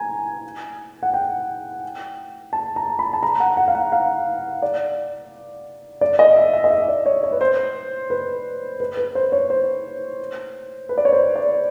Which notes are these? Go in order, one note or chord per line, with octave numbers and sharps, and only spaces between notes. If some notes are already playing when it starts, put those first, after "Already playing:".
Already playing: G#5 A#5
F#5
G5
A5
A#5
B5
A5
A#5
F#5
F#5
F5
F#5
F5
D5
D5
D#5
E5
E5
D#5
E5
D5
C#5
C#5
B4
C5
B4
B4
B4
C5
C#5
C5
B4
D5
C#5
C5
D5